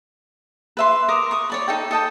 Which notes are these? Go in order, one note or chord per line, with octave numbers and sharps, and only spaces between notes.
B4 E5 C6
A#4 A#5 D6 D#6
C#6 D#6
C#5 D5 B5
D#4 A4 G5
A4 D#5 G5 A5